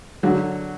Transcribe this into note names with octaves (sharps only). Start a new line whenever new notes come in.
D3 F#3 F#4